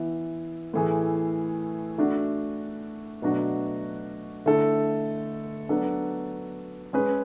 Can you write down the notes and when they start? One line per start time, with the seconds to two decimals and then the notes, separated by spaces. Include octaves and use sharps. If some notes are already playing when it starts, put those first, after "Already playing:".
Already playing: E3 B3 E4
0.74 A2 E3 A3 E4 G#4
1.98 A3 D4 F#4
3.22 B2 F#3 A3 D4 F#4
4.46 D3 A3 E4 A4
5.69 F#3 B3 D4 A4
6.93 G#3 C#4 G#4 B4